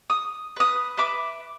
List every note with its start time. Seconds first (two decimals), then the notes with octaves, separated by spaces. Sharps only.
0.10 D#6
0.56 B4 D#6
0.97 B4 E5 B5 D6